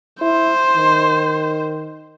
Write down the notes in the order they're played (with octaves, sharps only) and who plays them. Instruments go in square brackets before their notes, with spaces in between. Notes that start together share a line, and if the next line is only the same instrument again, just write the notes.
[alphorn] E4 [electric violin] C5
[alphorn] D#3